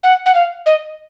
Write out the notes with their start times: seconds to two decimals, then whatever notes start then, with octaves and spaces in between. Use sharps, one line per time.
0.03 F#5
0.26 F#5
0.34 F5
0.66 D#5